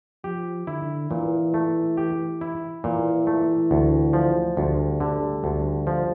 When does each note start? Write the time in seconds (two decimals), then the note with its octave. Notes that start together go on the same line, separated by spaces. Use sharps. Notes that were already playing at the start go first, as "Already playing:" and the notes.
0.24 F3 G4
0.67 D3 E4
1.10 A#2 E3
1.54 A3
1.97 G4
2.41 E4
2.84 A#2 E3
3.27 A3
3.71 D2
4.13 F3
4.57 D2 G3
5.00 D3
5.44 D2
5.87 F3